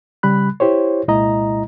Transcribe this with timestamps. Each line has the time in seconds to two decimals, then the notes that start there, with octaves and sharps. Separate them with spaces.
0.23 C#3 G3 B5 F#6
0.60 E4 G4 C5 C#5
1.08 C2 A#2 G#3 E4 D#5 A#5